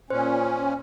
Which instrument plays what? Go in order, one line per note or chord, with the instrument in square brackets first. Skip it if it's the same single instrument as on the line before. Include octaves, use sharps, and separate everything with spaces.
[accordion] A#2 C#4 [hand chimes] C5